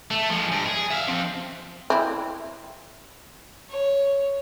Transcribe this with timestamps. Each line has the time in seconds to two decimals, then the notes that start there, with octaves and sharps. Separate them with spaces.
0.11 A3
0.30 F3 G#3
0.52 G2
0.66 G#4
0.91 E5 F5
1.08 F3 C4
1.90 C4 E4
3.68 C#5